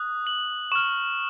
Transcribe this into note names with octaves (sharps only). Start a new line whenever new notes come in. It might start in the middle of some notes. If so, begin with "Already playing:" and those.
Already playing: D#6 F#6
F#7
C#6 F6 E7